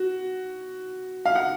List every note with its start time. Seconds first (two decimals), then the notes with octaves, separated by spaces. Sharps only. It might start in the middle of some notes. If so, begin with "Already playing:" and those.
Already playing: F#4
1.25 F5
1.35 F#5